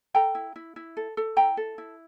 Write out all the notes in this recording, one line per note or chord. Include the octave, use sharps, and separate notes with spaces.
A4 G5 A#5
E4
E4
E4
A4
A4
E4 G5 A#5
A4
E4